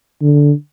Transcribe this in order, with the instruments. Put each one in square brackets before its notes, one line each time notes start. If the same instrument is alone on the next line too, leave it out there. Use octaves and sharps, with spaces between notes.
[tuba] D3